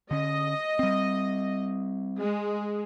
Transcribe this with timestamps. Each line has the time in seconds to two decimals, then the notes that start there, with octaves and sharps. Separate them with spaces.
0.11 D3 C#4 D#5
0.79 G3 C4
2.19 G#3